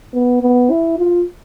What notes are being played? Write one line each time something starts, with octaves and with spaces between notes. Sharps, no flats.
B3
B3
E4
F4